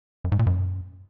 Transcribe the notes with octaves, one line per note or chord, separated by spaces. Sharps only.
F#2
G#2
A#2
F#2